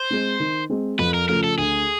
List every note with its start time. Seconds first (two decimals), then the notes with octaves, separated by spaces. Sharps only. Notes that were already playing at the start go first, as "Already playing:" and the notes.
Already playing: C5
0.11 G#3 C4
0.40 D#3
0.70 G#3 C4
0.99 F2 B4
1.14 A#4
1.29 C#3 F3 A3 A#4
1.44 A4
1.58 D2 G#4